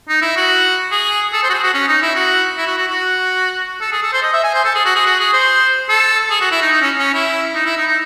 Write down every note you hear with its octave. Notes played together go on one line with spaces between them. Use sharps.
D#4
E4
F#4
G#4
A4
C5
F#4
G#4
F#4
C#4
D#4
E4
F#4
E4
F#4
F#4
F#4
A4
G#4
A4
C5
D#5
E5
G#5
C5
A4
G#4
F#4
G#4
F#4
G#4
C5
A4
G#4
F#4
E4
D#4
D#4
C#4
C#4
E4
D#4
E4
D#4
D#4